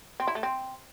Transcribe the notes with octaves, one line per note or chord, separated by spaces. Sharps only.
C4
E4
A3
C4